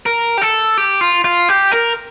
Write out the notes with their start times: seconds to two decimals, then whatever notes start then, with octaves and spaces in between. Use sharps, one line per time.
0.06 A#4
0.38 G4
0.42 A4
0.78 G4
1.01 F4
1.24 F4
1.49 G4
1.72 A#4